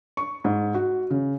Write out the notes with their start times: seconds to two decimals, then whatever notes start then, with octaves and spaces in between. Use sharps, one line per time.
0.17 C#6
0.44 G#2
0.74 F#4
1.10 C#3